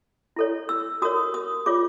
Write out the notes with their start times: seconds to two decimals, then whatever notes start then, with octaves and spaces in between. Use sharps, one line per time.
0.36 E4 A4 C#5
0.69 E6
1.02 F#4 A#4 C#5 D#6
1.34 D#6
1.66 F4 G#4 C#5 D6